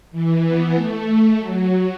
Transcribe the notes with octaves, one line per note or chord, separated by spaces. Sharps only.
E3
B3
A3
F#3